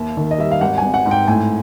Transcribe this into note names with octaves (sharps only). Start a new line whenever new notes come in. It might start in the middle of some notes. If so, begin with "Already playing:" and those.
Already playing: D#2 E5
D#3
D#5
G3 E5
F5
G#1 F#5
G#1 G#5
F#5
G#2
G5
A2 G#5